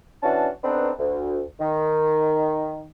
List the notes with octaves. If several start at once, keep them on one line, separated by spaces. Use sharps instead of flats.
E3 C#4 D4 F#4 A5
B3 C4 D4 D#4 A4 B4
D2
D#3